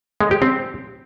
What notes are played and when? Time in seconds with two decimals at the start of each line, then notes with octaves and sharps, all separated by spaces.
0.21 G#3
0.31 G4
0.42 C4